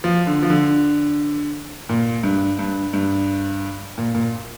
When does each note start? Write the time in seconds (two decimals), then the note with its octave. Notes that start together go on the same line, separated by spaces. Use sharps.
0.04 F3
0.27 D3
0.42 F3
0.50 D3
1.89 A#2
2.23 G2
2.59 G2
2.93 G2
3.98 A#2
4.15 A#2